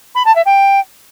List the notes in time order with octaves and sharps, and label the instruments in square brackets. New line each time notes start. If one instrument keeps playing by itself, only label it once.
[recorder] B5
A5
E5
G5